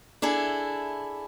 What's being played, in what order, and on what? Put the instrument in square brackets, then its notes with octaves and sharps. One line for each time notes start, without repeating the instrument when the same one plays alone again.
[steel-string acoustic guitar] D4 E4 G#4 A4